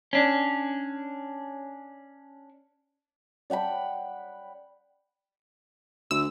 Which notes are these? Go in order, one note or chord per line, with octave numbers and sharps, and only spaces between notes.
C#4 D4
D5 F#5 G5 B5
D2 E6